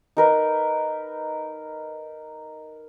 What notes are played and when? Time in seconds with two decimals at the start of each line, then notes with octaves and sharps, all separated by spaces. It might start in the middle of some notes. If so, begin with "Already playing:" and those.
0.17 D#4 A#4 B4